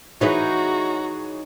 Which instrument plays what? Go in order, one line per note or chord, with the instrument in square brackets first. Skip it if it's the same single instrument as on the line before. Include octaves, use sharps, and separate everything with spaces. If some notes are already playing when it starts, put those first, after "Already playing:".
[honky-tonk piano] E3 G#4 C#5 [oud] D#4 E4 B4 [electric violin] F#4 A#5